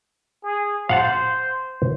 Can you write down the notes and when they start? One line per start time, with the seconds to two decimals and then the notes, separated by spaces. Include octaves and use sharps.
0.44 G#4
0.89 C5 F5 F#5 A5